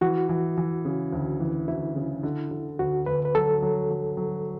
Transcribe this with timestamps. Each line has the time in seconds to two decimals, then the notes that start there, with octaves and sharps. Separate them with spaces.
0.01 E3 F#4
0.29 E3
0.58 E3
0.85 C#3
1.12 D2
1.40 E3
1.68 D2 E4
1.96 C#3
2.23 D3
2.51 D3
2.79 D2 F#4
3.06 D2 B4
3.25 B4
3.35 F#3 A4
3.62 F#3
3.90 F#3
4.17 F#3